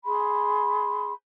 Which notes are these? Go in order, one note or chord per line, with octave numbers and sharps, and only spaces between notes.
G#4 B5 C6